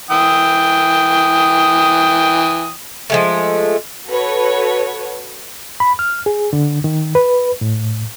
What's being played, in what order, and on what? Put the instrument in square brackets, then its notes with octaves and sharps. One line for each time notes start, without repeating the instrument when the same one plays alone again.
[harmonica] E3 G5 D#6
[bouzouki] F3 G#3 A3
[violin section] F#4 A4 B4 C#5
[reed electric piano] B5
F6
G#4
D3
D#3
B4
A2